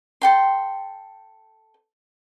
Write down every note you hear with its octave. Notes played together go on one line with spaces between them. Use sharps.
A4 G5 C6